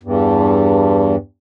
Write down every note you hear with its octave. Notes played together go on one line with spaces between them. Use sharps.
E2 G2